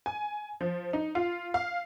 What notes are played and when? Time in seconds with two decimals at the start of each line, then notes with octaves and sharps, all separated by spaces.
0.06 G#5
0.61 F3
0.93 D#4
1.15 F4
1.54 F5